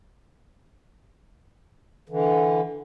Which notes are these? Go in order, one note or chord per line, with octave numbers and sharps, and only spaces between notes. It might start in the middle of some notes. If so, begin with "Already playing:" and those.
D3 E3